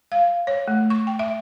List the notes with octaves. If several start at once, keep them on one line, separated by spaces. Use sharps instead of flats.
F5
C#5
A3
C#6
G5
E5